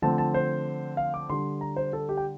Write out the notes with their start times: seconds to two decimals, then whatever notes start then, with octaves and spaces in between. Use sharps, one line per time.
0.02 D3 F3 A3 C4 A5
0.18 A5
0.34 C5
0.97 F5
1.14 D6
1.30 D3 G3 D4 C6
1.61 A#5
1.76 C5
1.93 A4
2.09 G4
2.17 G5